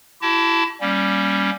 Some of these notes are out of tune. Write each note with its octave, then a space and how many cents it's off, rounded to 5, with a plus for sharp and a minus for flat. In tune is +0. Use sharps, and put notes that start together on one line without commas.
E4 +25 G4 -40 A5 +0
G3 +0 A#3 +20 C#4 +0